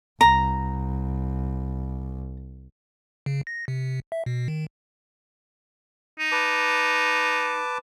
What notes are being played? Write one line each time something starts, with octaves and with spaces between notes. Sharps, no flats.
C2 A#5
C#3
A#6
C3
E5
B2
D#3
D#4
B4 A5 D6